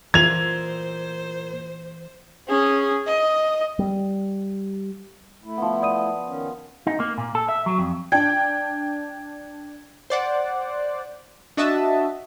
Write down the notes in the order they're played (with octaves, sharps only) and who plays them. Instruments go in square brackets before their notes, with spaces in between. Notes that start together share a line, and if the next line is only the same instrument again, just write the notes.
[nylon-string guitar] A#2 F4 [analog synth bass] E3 [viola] C5 [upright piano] G#6 F7
[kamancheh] C#4 G#4
D#5
[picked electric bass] G3
[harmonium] A3 E4
[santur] F3 B3
[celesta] D5 D#6 D#7
[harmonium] D#3 C#4
[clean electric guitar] D#4
A#3
A#2
A4
E5
F#3
F2
[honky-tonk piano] D4 G5 [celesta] G#6
[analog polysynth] C5 D5 F#5
D4 F#4 D#5 E5 A5